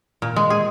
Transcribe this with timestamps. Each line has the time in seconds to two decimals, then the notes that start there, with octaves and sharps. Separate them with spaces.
0.22 A#2
0.36 G#3
0.50 G#4